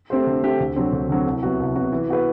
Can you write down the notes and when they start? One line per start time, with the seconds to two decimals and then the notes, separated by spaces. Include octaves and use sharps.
0.10 A3 C4 G4 C5
0.27 D3
0.43 A3 C4 G4 C5
0.60 D2
0.76 D3 F#3 C4
0.93 D2
1.09 D3 F#3 C4
1.26 C2
1.43 C3 F#3 B3 F#4
1.59 C2
1.75 C3 F#3 B3 F#4
1.92 E3
2.09 B3 F#4 B4